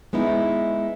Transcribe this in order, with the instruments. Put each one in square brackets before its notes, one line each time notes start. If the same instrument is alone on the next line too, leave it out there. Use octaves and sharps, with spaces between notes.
[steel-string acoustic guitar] G#3 B3 D#4 E4